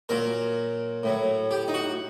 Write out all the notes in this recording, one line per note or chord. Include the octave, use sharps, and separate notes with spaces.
A#2 F#3 A#4
A2 F#3
G4
D#4
F#4